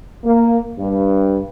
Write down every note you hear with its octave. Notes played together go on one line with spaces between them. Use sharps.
A#3
G2